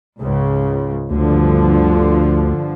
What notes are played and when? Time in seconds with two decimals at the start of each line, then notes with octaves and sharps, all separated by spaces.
0.19 C#2 G#2 C#3
1.10 D2 G2 D3 F3